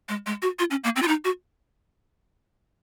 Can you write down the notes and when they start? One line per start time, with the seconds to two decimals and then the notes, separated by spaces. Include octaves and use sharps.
0.09 G#3
0.26 G#3
0.42 F#4
0.59 F4
0.71 C#4
0.84 A#3
0.96 C4
1.02 F4
1.08 D#4
1.24 F#4